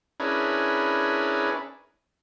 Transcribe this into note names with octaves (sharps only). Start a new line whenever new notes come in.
C#4 D4 E4 G#4 A#4 B4